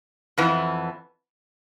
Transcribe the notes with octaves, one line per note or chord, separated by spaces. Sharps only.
F2 E3 B3